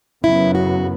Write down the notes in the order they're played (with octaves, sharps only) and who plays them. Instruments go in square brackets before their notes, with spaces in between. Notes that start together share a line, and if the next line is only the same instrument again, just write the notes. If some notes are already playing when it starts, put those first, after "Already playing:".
[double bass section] F#2 C#3 F#3 B3 [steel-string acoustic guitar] E4
[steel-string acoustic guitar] F#4